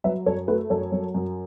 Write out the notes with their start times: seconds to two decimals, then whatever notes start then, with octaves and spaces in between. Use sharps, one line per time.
0.04 F#3 B4 E5
0.26 F#2 A4 C#5
0.48 A3 F#4 B4
0.70 F#2 A4 C#5
0.92 F#3
1.14 F#2